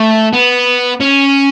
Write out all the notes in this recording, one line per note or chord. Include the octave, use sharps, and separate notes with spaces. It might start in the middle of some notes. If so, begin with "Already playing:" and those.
Already playing: A3
B3
C#4